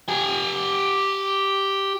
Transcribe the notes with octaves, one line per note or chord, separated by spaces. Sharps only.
G4 G#5